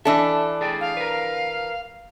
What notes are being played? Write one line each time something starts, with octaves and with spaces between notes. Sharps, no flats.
E3 D4 A4 E5
G#4 D5 G5
F5
A#4 B4